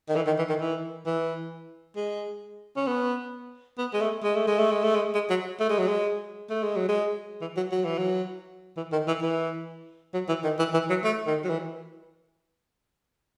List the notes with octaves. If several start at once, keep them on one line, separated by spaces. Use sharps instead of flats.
D#3
E3
D#3
E3
D#3
E3
E3
G#3
C#4
B3
B3
G#3
A3
G#3
A3
G#3
A3
G#3
A3
G#3
G#3
F#3
A3
G#3
F#3
G#3
A3
G#3
F#3
G#3
E3
F#3
F#3
E3
F#3
E3
D#3
E3
E3
F#3
E3
D#3
E3
E3
F#3
A3
D#3
F#3
E3